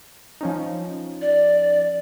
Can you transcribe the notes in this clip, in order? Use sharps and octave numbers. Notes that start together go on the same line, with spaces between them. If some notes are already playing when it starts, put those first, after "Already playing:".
F3 C#4 D#4
D5